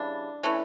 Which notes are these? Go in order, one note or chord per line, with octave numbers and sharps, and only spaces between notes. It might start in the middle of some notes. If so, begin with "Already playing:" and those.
Already playing: C#3 E3 G3 D4
E3 A3 C#4